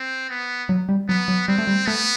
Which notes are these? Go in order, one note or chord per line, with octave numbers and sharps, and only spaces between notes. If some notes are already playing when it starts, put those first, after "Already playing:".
Already playing: C4
B3
F#3
G3
F#3 B3
F#3
G3 C4
A3
G3
A3 B3